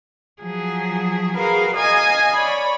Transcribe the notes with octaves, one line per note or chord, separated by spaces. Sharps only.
F3 F#3 G#4
F#4 G#4 A#4 B4 F5
D#5 F5 G#5 D#6 G#6
C#5 D5 B5